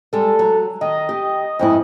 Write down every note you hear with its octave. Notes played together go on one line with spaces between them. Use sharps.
G3 G#3 A4
F#3
D#3 D#5
G4
F2 G#2 E4